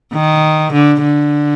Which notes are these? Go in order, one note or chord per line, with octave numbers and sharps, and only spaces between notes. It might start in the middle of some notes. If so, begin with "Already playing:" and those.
D#3
D3
D3